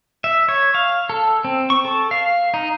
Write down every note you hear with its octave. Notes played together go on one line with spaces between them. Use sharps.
E5
C#5
F5
A4
C4
C#6
A4
F5
D#4